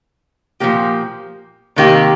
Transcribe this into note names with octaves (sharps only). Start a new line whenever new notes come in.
A#2 F3 A#3 G4
C3 D#3 A#3 G4